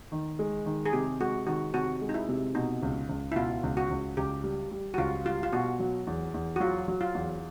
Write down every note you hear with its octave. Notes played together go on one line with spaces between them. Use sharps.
D#3
G#3
D#3
G#4
C3 G4
G#3 F#4
D#3 F#4
C3 F#4
G#3
D#4
E4
C3
B2 D#4
C#2
C#2
E4
B2 F4
C#2
F#4
C#2
C#2 G4
G3
G3
F#4
C#2 F4
G3 F4
F4
B2 F#4
F#3
E2
E2
F#4
F#3 F4
F#3
F4
E2